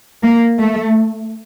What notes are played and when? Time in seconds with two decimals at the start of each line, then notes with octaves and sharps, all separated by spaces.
0.23 A#3
0.59 A3